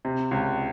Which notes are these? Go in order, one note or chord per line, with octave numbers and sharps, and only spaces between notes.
C3
C#2